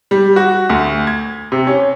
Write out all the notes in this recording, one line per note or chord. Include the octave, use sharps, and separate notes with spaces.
G3
F#4
D2
G#6
C3
C#4